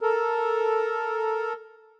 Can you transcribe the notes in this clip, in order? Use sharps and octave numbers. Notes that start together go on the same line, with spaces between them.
A4 A#4